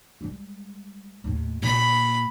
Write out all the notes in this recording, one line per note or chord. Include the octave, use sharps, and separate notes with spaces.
G3 G#3
D#2 A2
A#2 B5